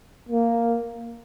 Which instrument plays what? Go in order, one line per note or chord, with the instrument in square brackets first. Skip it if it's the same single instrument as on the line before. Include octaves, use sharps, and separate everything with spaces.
[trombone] A#3